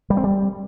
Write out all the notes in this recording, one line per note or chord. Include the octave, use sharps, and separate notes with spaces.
G3
C4
G3